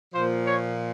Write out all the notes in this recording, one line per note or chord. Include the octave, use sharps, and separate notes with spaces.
A#2 F3 C5
C#5